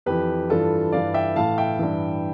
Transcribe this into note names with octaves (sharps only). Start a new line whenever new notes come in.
F2 E3 G4 B4
G2 E3 F4 A4
G2 E3 D5 F5
E5 G5
A2 E3 F5 A5
E5 G5
G2 E3